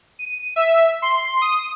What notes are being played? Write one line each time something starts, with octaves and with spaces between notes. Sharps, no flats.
D#7
E5
C6
D#6